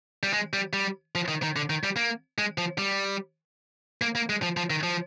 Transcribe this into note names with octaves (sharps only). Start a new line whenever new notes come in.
G3
G#3
G3
G3
F3
D#3
D#3
D3
D#3
G3
A#3
G#3
F3
G3
A#3
A#3
G#3
F3
F3
D#3
F3